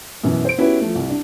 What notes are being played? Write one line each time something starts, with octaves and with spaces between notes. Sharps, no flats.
F#2 B2 E3
C5 D7
B3 C#4 E4 F#4 G4 B4
F3 A3
C2
D4